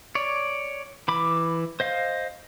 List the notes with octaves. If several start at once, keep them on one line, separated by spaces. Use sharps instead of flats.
C#5 D5
E3 B5 D6
C5 D#5 F5